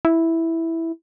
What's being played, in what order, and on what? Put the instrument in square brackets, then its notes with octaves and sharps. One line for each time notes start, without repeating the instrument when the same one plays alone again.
[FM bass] E4